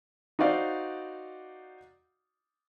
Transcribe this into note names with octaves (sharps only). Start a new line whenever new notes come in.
D#4 F#4 C5 D5 F5